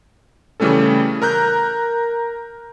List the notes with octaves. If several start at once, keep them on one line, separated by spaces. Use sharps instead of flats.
C#3 E3 G3 A3 C#4 A4
A#4 A#5 F#6 G6